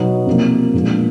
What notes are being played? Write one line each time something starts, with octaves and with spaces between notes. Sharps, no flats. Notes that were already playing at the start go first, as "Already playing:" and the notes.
Already playing: B2 F#3 B3 D#4 F#4
C3 F3 A#3
A#2 F3 G#3 B3 D4